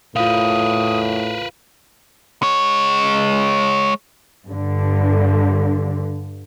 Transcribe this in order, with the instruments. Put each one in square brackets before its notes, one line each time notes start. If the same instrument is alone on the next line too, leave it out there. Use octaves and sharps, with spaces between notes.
[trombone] A2 [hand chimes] F4 F5 [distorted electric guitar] A#4 B4 [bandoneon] D#6
[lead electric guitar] G#3 C#5
[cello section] G2 D3